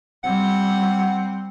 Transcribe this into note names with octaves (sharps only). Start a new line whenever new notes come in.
G3 C4 F#5